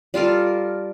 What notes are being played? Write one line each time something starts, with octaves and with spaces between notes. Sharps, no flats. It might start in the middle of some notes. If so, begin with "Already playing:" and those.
G3 F4 A4 A#4